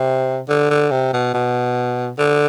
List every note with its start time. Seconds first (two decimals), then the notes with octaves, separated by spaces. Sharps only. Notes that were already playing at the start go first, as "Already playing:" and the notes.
Already playing: C3
0.49 D3
0.70 D3
0.91 C3
1.13 B2
1.34 B2
2.18 D3